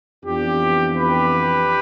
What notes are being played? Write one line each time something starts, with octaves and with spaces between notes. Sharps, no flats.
F2 E3 B3 D4 F4 G4
G4 B4